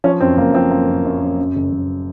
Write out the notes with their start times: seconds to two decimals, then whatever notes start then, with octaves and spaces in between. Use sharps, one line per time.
0.04 F3 C#4
0.20 F#2 C4
0.37 F#1 A#3
0.54 F3 C4
0.70 F#2 A#3
0.88 F#2
1.05 F#2
1.22 F#2
1.39 F#2
1.56 F#1
1.72 F#1